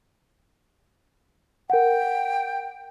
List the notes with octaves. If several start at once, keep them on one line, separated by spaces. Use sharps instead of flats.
A#4 F#5 G5